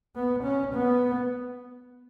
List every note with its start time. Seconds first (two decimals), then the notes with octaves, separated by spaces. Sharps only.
0.16 B3
0.44 C#4
0.74 B3